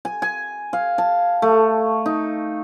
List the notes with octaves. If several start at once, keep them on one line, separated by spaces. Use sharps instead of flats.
G#5
G#5
F5
A5
A3
D#4